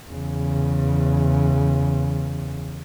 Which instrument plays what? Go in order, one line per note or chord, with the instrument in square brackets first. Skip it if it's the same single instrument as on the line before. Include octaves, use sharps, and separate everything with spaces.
[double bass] E2 C#3